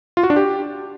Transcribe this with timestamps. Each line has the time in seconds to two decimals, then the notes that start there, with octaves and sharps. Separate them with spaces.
0.17 F4
0.23 F#4
0.30 D4
0.36 G4